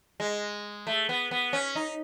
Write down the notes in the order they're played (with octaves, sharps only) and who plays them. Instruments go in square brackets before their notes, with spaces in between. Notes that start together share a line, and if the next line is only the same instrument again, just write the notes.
[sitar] G#3
A3
B3
B3
C#4
D#4